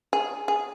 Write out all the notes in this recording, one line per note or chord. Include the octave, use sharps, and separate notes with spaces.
G#4
G#4